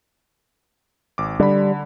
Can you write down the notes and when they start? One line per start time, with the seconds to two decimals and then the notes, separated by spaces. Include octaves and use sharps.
1.18 G#1 D6
1.40 D3 G3 B5